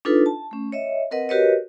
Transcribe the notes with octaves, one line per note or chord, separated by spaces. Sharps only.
D4 D#4 F4 A4 B4
A5
A3 C#4
C#5 D#5 E5
C4 A#4 B4 D#5 F#5
F#4 G4 A#4 B4 C#5 D#5